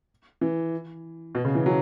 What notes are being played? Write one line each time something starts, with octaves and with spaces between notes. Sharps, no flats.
E3
B2
C#3
E3
F#3